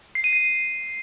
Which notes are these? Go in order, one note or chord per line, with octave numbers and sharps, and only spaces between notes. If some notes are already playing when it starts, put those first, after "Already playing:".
C7
D#7
C7